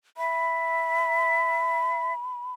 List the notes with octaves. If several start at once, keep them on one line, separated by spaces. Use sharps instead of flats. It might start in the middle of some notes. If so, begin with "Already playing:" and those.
E5 B5